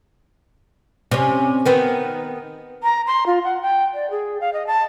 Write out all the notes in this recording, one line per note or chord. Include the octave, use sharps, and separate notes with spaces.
C3 C#4
D#3 B3 C4
A#5
C6
F4
F#5
G5
D5
G#4
F5
D#5
A5